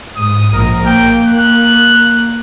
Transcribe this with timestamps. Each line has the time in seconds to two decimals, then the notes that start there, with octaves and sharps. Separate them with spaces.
0.16 G#2 D#6
0.53 A#1 A#4
0.85 A#3 G5
1.26 F#6